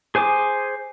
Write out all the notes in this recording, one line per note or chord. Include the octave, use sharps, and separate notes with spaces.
G#4 C5 G#5 D6 D#6